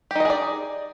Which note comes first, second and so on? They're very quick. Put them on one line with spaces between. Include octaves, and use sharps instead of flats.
G4 D#4 D#5 G#4 D5